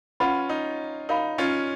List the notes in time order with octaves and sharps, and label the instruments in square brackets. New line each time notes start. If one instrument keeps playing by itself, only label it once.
[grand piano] C#4 F4 [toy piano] B4 F#5 B5
[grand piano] D#4
[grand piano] D#4 [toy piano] F#4 A#4 F5 B5
[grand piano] C#4 F4